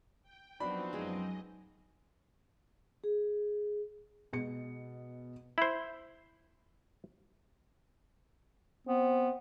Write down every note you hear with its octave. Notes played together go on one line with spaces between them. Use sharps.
G5
F3 F#3 B3 C4 D4 D#4 F#4 B5
F#2 G#3 D#4 G#4 D#5
G#4
B2 G#3 C#7
E4 C5
B3 C4